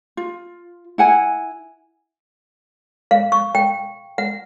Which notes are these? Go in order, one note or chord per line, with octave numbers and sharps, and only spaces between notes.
F4
E4 F#5 G#5
F5
C#6
G5
F#5